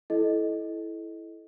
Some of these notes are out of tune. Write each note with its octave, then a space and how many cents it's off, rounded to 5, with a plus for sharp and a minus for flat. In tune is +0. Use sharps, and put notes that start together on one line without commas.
E4 +0 A4 -25 D#5 +0